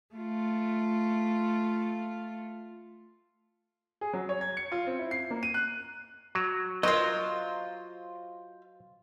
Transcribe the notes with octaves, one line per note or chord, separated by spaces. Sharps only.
A3 F4
G#4
F#3
C#5
G#6
C#7
F4
C4
E4
C7
A#3
D#7
F#6
F#3
F#3 F4 A#4 C5 D#5